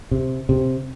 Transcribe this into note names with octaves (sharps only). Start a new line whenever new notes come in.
C3
C3